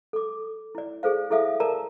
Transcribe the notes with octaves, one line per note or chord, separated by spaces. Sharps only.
A4 D6
E4 D5
G#4 A4 C5 F5
E4 G#4 A4 E5 F5 D#6
A#4 D5 A5 A#5